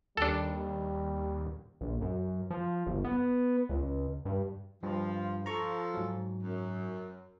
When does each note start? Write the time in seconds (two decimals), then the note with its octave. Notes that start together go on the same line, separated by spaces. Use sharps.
0.17 D#2 G3 D4 A4
1.81 A#1
2.01 F#2
2.50 F3
2.87 G1
3.04 B3
3.69 C#2
4.25 G2
4.83 G2 F3
5.46 F3 A4 A#5 C#6
5.94 G#2 F#3
6.44 F#2